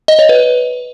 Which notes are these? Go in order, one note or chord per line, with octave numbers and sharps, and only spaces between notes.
D#5
C#5
B4